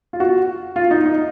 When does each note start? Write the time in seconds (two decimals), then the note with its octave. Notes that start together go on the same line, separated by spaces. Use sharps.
0.13 F4
0.20 F#4
0.76 F4
0.91 D#4
1.06 D#4